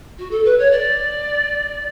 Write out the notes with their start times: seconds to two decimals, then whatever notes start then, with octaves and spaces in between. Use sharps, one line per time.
0.18 F#4
0.30 A4
0.44 B4
0.58 C#5
0.71 D5